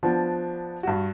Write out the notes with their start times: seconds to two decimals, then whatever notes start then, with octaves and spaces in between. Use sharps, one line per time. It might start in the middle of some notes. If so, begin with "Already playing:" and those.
0.03 F3 B3 D4
0.83 G2 F#4